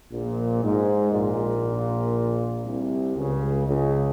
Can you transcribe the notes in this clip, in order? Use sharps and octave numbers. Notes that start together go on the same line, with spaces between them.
A#1 A#2
G#2
A#1 A#2
C2 C3
C#2 C#3
C#2 C#3